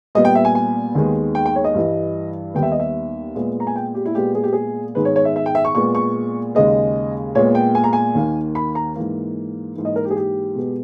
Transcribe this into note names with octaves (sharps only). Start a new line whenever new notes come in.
A#2 G3 B3 D#5
G5
E5
G#5
G#5
D#2 D#3 G#3 B3
G5
G5
C#5
D#5
G2 E3 G3
D#2 D#3 G3 B3 G5
E5
D#5
E5
A#2 G#3 B3
A#5
G#5
G5
G4
E4
A#2 G#3 B3 G4
G#4
G4
G#4
G#2 D#3 G#3 B3 B4
C#5
C#5
E5
E5
G5
E5
C#6
A#2 G#3 B3 C#6
C#6
D#2 C#3 G#3 D#5
A#2 G#3 B3 C#5
G5
G#5
A#5
G#5
D#2 D#3 A#3
B5
A#5
G#2 E3 A#3
G#2 E3 A#3
D#5
A#4
G4
G#4
G4
B2 G#3 B3